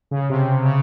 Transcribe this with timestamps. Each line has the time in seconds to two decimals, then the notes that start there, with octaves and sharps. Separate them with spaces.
0.11 C#3
0.29 C3
0.65 C#3